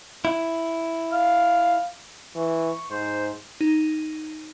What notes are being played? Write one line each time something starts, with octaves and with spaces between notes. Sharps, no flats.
E4
F5
E3 C#6
G#2 C5
D#4